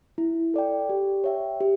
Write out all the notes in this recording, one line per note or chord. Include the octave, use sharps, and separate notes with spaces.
E4
A4 D5 G5
G4
C#5 E5 G5
G4